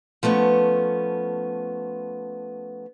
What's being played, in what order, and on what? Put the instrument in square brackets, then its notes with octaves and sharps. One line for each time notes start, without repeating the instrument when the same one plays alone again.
[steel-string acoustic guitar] F3 A3 B3 C#4